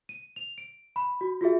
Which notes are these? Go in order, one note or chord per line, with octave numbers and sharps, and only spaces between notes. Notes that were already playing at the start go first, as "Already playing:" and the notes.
D#7
F7
D7
B5
F#4
F4 F#4 G#4 E5